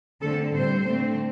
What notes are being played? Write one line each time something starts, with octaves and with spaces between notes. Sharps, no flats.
D3 A3 C4 A4
A2 G3 C4 C5
D3 A3 C4